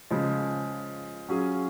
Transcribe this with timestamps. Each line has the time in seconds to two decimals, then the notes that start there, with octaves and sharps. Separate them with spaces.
0.11 C#3 F3 G#3
1.29 F#3 C#4 F4 G#4